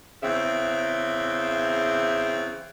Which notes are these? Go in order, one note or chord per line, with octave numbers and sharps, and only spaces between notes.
E2 C#3 C4 E5